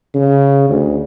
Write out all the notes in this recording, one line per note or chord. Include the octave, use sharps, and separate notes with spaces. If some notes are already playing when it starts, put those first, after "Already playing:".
C#3
D2